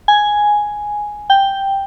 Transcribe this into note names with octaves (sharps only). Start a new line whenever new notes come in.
G#5
G5